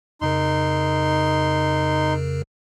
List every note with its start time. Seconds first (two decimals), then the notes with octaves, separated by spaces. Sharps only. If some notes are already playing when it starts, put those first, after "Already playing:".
0.21 F2 C#3 D#4 A#4 C6